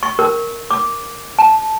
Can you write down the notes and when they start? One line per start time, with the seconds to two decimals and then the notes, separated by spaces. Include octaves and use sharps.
0.03 C#6
0.19 A#4
0.71 D6
1.39 A5